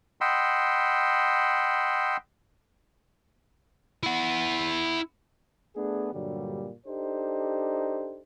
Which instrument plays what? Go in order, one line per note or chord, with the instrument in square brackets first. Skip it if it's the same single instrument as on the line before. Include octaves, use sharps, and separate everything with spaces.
[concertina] D#5 F#5 G5 B5 C6 E6
[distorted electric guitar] E4 F#5
[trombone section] A3 B3 D4 G#4
G2 A#2 D3 F#3 G3
D4 D#4 G4 A4 C5